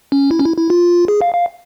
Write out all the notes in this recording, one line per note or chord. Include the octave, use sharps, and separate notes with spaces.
C#4
E4
C#4
E4
E4
F4
G#4
F5
F5